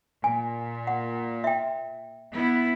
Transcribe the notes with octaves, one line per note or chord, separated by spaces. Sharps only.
A#2 G#5
F#5
E5 G5
B3 E4